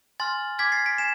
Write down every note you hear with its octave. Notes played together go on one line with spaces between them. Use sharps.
G#5 C6 F6 A6
G#5 D6 F6 G#6 B6
A6 C7
B6 D7
G#5 C7 E7